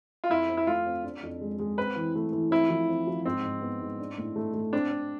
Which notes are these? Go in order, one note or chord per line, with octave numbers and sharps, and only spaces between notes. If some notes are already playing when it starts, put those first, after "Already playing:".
F4
F2 E4
C4
E4
A3 F4
C4
D4
F2
G#3
G#3
C4 B4
E3
A3
E3
C4 E4
F3
C4
F3
G#2 C4
G#2
B3
G#2
D4
A2
A3
A3
C4 D4
C4